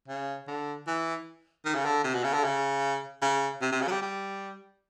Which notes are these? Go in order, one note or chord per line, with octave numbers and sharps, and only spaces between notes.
C#3
D3
E3
D#3
C#3
D3
C3
B2
C#3
D3
C#3
C#3
C3
C3
C#3
F#3
G3
G3